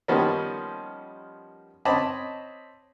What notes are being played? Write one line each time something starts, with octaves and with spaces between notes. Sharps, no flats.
D#3 F3 G3 A#3 B3 C#4
C4 C#5 D#5 A5 B5 D6